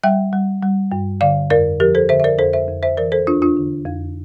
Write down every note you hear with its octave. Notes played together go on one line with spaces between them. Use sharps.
G3 E5 G5
G3
G3
G2
D3 D5 F5
F2 A#4 D5
F3 G4 A#4
A4 C5
D3 C5 E5
E5
A#4 D5
F2 A4 C5
C5 E5
F2
C5 E5
E3 A#4 D5
A4 C5
E2 D4 F4
D4 F4
D3
F2